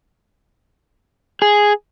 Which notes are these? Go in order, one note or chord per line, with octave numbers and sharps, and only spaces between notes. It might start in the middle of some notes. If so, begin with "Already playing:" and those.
G#4